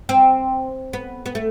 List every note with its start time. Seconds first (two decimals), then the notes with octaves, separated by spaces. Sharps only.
0.09 C4
0.93 B3
1.26 B3
1.35 A3